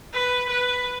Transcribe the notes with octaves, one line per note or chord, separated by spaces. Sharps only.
B4
B4